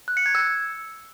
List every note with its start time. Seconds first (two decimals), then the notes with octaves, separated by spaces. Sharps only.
0.08 F#6
0.17 C#7
0.26 G#6
0.35 E6